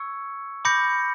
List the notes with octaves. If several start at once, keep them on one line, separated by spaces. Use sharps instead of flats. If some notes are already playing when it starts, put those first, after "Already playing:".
Already playing: C#6 E6 G#6 C#7
B5 D6 G6 A#6 C#7